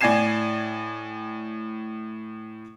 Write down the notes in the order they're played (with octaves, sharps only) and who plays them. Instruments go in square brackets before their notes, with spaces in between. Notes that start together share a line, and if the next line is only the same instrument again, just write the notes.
[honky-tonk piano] A2 D5 G#5 G#6 C7 E7